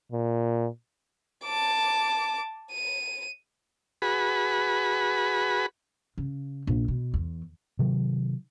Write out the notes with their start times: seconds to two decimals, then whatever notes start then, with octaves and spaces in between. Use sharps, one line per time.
0.12 A#2
1.44 A5 D6
2.71 D#7
4.02 F#4 G#4 B4 B5
6.18 C#3
6.67 A#1
6.88 B2
7.14 E2
7.79 C3 D#3 F#3